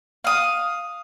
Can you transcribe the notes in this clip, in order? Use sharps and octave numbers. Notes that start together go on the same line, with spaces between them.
F5 D#6